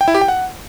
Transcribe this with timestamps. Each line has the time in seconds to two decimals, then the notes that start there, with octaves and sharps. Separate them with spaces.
0.01 G5
0.08 E4
0.15 G4
0.21 G5
0.28 F#5